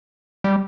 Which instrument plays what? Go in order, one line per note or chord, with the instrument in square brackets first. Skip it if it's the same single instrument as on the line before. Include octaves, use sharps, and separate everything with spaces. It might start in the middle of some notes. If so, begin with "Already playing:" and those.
[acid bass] G3